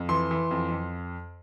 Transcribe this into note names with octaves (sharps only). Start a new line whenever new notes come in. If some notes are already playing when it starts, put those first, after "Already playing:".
Already playing: F2
E3 C6
E3
F2
F2